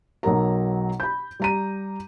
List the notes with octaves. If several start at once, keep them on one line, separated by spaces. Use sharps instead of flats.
B1 F#3 A#4 A#5
B5 G6
G3 A#5 D#7